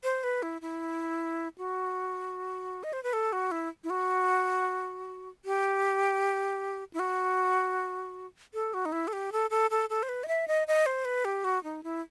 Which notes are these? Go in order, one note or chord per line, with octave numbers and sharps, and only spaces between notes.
C5
B4
E4
E4
F#4
D#5
C5
B4
A4
F#4
E4
E4
F#4
G4
E4
F#4
A4
F#4
D#4
E4
A4
G4
A4
A4
A4
A4
C5
B4
D#5
E5
D#5
D#5
C5
B4
G4
F#4
D#4
E4